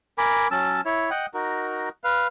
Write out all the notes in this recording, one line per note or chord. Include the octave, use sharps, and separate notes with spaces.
A#4 G#5 B5 D6
F#3 C#4 A5 E6
E4 C#5
D#5 F#5 G5
D#4 F#4 A#4
B4 F5